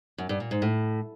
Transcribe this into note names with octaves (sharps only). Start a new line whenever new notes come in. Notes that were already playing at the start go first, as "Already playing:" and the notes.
F#2
G2
A#2
G#2
A2